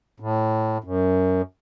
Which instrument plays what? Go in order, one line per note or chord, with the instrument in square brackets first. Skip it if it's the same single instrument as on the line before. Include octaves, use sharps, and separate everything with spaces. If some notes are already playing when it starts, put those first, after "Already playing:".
[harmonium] A2
F#2